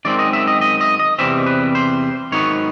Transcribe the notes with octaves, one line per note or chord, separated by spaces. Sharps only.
F#2 D#3 G#3 C4 D5
D#5
E5
D#5
D#5
D#5
D#5
E2 C3 E3 G3 C4 E5
B4
C5
G#2 D#3 F#3 B3 C#5